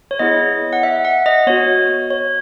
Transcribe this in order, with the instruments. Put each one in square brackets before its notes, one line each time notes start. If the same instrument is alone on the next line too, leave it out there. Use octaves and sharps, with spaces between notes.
[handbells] C#5
B3 E4 G#4 D#5
F#5
E5
F#5
D#5
B3 F#4 C#5
C#5